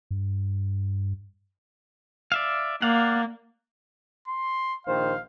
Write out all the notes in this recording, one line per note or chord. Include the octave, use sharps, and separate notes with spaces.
G2
D5 E5 F5
A#3 D5 F5 F#5
C6
A#1 D#3 C5 F5